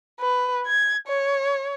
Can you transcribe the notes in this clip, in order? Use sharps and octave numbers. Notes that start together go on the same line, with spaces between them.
B4
G#6
C#5